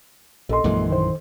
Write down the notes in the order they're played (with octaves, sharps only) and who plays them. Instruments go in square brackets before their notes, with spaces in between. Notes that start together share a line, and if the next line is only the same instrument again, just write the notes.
[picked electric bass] A#1 [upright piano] A4 D#5 C6
[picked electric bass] A#1 F#2 E3 [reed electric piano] G#3 A#3
[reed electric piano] D#3 C5